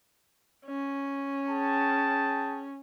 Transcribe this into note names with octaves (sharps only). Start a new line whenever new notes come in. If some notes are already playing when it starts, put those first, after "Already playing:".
C#4
G#4 G5 A5